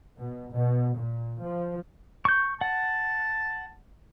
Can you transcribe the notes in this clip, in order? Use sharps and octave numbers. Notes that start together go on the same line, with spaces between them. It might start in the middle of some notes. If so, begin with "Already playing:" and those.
B2
B2
A#2
F3
C#6 G6
F#5 A5